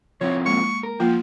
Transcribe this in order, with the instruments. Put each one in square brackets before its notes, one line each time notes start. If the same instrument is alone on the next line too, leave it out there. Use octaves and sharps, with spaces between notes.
[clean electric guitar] F3 C4 E4 [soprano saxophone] C#5
[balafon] G#3 A#3 [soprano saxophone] C#6
[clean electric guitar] A#4
[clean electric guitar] F3 [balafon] A#3 F4 [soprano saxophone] G5